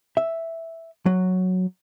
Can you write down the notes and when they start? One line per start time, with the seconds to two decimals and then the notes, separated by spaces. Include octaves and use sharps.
0.17 E5
1.06 F#3